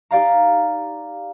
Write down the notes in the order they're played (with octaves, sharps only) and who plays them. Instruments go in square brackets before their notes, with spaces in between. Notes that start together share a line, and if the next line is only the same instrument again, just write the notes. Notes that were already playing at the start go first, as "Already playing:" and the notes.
[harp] D#4 G4 D5 F5 A#5